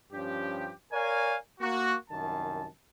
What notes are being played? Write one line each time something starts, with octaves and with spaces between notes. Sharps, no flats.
G2 F3 C#4 G4
A#4 C#5 D5 F5 G#5
A#3 F#4
C2 F#2 D#3 A5